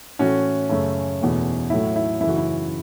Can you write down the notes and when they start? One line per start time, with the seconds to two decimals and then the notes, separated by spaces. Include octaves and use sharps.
0.19 A2 E3 A3 C#4 F#4
0.69 F#2 C#3 A3 C#4
1.21 E2 B2 A3
1.70 A2 F#3 A3 E4
1.96 E4
2.21 F#2 C#3 E3 A3 E4
2.29 F#4
2.38 E4